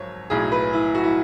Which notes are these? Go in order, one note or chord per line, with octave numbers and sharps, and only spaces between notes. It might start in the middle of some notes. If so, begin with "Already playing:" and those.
Already playing: G#1 F#3 C#5
B1 A2 F#3 G#4
B4
E4
F#4
E4